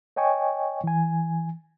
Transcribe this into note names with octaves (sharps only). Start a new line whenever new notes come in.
C#5 D#5 G5 G#5 C#6
E3 G#5